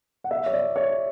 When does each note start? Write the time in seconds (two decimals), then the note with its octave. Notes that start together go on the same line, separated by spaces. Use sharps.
0.24 F#5
0.31 E5
0.46 C#5
0.53 D5
0.76 C#5